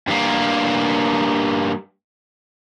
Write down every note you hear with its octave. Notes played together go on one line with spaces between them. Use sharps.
G2 A#3